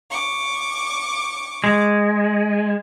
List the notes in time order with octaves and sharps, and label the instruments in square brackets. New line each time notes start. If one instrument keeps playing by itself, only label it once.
[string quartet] C#6 D6
[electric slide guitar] G#3